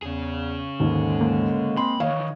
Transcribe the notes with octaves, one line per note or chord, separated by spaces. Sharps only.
E2 C#3 G#4
D#2 G#2 D3 G#3
A#3
G#3 C4 B5 C6
D#3 E3 C#5 D#5 F5